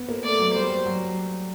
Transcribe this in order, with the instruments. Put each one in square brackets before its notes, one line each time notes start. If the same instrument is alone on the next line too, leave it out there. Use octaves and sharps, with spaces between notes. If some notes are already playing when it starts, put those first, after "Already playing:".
Already playing: [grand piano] B3
A#3
[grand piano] A3 [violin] D5
[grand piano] F#3
[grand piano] G3 [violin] C5
[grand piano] F#3
F#3